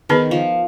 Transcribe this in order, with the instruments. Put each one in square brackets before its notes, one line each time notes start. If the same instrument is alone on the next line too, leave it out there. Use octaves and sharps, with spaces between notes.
[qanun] D#3 [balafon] B3 D#4 G#4 B4
[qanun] F3